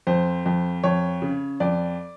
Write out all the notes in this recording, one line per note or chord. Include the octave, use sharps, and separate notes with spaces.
F2 C5
F2
F2 C#5
C#3
F2 D5